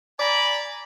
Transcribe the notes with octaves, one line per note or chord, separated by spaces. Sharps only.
D5 G#5 A#5 B5